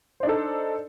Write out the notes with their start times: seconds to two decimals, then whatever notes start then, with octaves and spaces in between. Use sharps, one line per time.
0.20 C5
0.23 D4
0.26 D#4
0.29 A4